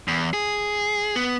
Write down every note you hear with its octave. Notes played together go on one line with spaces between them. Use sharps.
E2
G#4
B3